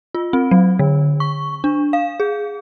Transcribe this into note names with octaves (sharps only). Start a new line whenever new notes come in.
F4
C4
F#3
D3
C#6
D4
F5
G#4